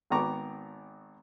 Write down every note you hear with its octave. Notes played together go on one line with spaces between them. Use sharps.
G#1 D#3 B3 A#5 C#6 D6